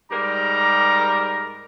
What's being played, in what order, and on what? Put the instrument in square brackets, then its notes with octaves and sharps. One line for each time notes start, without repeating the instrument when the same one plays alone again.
[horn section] G#2 G3 G4 A#4 A#5